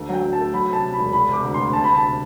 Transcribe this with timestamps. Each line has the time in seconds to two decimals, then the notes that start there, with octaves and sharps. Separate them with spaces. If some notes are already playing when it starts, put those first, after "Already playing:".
Already playing: D2 A3
0.09 F#3 G5
0.23 F#3
0.33 A5
0.38 A3
0.53 F#3 B5
0.68 C3 A5
0.83 C3
0.93 B5
0.98 E1
1.13 E1 B5
1.29 C3 D6
1.43 D2
1.54 D2 C6
1.73 C3 A5
1.84 D2 B5
1.95 A5
2.05 C3